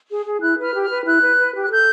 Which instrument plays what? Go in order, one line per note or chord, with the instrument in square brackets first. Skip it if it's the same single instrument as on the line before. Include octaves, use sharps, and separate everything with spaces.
[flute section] G#4
G#4
E4 F#6
B4 F6
G4
F6
B4
E4 F#6
B4
B4
G4
F#6
A4 G6